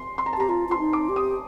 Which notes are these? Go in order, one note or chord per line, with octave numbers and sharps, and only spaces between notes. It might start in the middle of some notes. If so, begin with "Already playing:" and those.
Already playing: C6
C6
A#5
A5
G4 A#5
F4 A#5
F4 C6
D#4
D6
G4
D#6